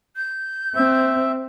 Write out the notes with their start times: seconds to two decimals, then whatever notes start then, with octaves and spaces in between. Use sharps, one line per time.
0.16 G6
0.75 C4 E5